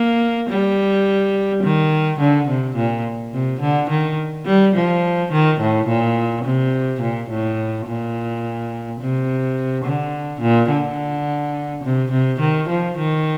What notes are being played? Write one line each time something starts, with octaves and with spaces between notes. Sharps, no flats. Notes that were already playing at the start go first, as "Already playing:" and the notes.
Already playing: A#3
G3
D#3
D3
C3
A#2
C3
D3
D#3
G3
F3
D#3
A2
A#2
C3
A#2
A2
A#2
C3
D3
A#2
D3
C3
C3
D#3
F3
D#3